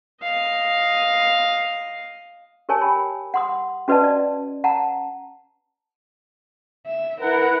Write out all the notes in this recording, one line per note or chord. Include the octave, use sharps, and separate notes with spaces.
D#5 F5
G4 A#4 C#5 G#5 A5
G4 G5 B5
F#5 C6 D#6
C#4 F#4 B4 D5 D#5 A5
D5
F#5 A5 A#5
E5
E4 A#4 B4 F#5